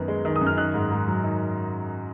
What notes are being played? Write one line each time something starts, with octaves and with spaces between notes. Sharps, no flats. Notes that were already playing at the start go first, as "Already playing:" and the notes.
Already playing: F#2 D#3 B3
G#3
D#3
D#6
F#2
F6
D#3 F#6
G#2
G#2
F#3
D#3